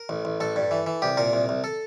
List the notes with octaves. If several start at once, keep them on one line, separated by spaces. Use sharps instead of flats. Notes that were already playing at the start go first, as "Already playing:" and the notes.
Already playing: A#4
A1
A1
A1 A4
G2
E3
E3
C2 G4
A#2 A#4
C2
C2
A4